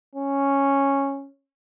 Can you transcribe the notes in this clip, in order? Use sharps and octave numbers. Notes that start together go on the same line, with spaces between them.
C#4